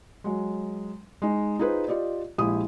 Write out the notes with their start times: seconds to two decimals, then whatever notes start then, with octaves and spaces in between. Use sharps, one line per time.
0.24 F#3 G#3
1.22 G#3 D#4
1.59 D#4 F4 G#4 B4 C5
1.88 F4 G4 D5 D#5
2.38 A#1 G#3 E4 G4 D#6